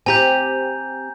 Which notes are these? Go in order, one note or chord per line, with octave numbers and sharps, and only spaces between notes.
C4 G4 G#5 A#5 G6